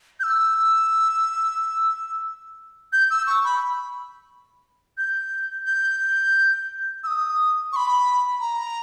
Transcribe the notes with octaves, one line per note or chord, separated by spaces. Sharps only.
G6
E6
G6
E6
C#6
B5
G6
G6
E6
D#6
C#6
B5
A#5